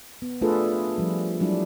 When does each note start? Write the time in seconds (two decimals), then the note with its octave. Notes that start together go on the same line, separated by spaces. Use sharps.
0.22 B3
0.42 A3 D4 F4 G#4 A4 B4
0.98 F3 G3
1.41 F#3 G3 D4 E4